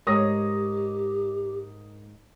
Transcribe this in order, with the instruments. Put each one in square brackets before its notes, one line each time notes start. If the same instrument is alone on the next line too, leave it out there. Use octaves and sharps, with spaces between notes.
[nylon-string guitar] G#2 C#5 D#5 [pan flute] G4 [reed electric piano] A#4 [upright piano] C#6 D#6 A#6